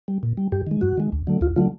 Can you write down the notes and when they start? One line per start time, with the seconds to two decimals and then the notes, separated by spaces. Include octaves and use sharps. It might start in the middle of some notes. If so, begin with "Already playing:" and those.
0.08 G3
0.23 A#2
0.37 G3
0.52 G2 G4
0.67 D#3 G#3
0.81 G2 F#4
0.97 D#3 G#3
1.12 D2
1.27 D3 F#3 A3
1.41 D2 F4
1.56 D3 F#3 A3 F4